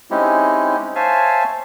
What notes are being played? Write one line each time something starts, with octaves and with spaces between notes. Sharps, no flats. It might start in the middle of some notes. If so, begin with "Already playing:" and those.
G#3 C4 C#4 D#4 E4 G4
C5 C#5 E5 F5 G#5 A5